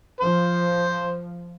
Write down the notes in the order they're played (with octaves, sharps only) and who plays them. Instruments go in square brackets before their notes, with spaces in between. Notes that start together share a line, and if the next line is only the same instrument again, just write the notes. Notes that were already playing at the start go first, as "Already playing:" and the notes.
[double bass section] F3 [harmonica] C5